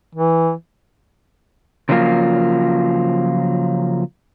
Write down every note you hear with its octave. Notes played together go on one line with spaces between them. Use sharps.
E3
C#3 F3 F#3 A#3 F4